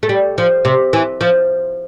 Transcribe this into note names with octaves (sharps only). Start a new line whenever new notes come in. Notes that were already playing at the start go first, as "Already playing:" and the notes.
A3
G3
F3
C3
E3
F3